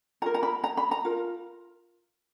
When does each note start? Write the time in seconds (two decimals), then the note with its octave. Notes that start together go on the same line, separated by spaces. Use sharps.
0.22 F4 A#4 A#5
0.34 A#5
0.43 B5
0.64 A#5
0.77 B5
0.91 A#5
1.05 F4 A#4